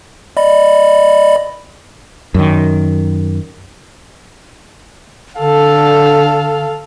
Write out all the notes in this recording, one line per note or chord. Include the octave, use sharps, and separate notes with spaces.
D5 D#5 B5
F#2 D#3
D3 A4 F5